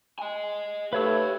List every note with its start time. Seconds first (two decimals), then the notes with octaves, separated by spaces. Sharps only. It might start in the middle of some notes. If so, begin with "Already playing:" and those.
0.19 D#5 G#5
0.93 A3 G4 B4 C#5 F5 E6